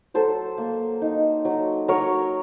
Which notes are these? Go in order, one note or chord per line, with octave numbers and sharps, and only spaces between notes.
F#3 A4 C5
A#3
D#4
F#3
F#3 A#4 C#5